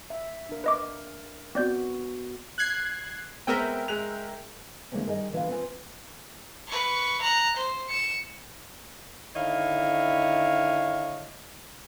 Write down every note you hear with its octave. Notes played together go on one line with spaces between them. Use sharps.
E5
D4 A#4
B4 D#5 D6
B3 C4 F#4 D5 G6
F#6 G#6 C7
G#3 B3 C4 A#4 E5 G5
G#3 F#6 F7
D3 E3 G#3 A#3 C4 C#4
D#3 G3 G#4 D#5
D3 E3 F4 G#4 B4 F5
C4 F4 B4 C5 G#5
B4 C#6
A#5 F#6
C5
C#7 E7
D3 D#3 E4 C#5 D#5 F5